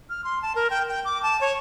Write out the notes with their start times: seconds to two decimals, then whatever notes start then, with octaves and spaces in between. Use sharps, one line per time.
0.10 F6
0.24 C6
0.42 A5
0.55 A#4
0.70 G5
0.89 G5
1.05 D6
1.23 A5
1.41 C#5